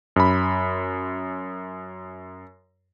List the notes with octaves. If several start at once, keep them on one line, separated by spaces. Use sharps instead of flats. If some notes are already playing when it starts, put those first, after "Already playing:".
F#2 B5